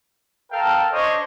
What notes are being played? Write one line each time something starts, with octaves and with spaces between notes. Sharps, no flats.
A4 A#4 F5 G5 A5
D4 C5 C#5 D#5